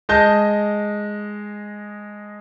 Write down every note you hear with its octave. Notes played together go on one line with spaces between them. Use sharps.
G#3 D#5 A5 G6